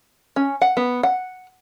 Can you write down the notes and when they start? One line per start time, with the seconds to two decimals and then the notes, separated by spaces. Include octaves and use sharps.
0.36 C#4
0.62 F#5
0.77 B3
1.03 F#5